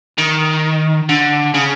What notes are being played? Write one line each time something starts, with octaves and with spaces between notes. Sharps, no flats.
D#3
D3
C#3